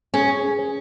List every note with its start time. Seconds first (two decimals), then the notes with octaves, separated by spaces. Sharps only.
0.14 C#4 G#4